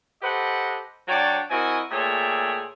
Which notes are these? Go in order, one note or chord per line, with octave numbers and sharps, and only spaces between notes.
G4 A4 B4 C5 D#5 F#5
F#3 D4 F#4 C#5 D5 G5
C4 E4 F#4 A#4 D#5 G#5
A#2 A3 G#4 C#5 E5 G5